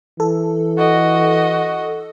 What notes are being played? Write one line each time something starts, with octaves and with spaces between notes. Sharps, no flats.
E3 A4
F#4 D#5